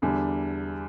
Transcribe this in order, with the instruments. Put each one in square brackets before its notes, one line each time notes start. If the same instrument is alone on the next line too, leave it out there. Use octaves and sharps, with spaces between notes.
[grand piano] E2 D3 G3 D4